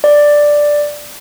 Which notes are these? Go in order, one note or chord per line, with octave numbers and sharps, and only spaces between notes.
D5